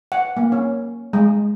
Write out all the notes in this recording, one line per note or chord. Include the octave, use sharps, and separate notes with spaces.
F#5
A#3
C#4
G#3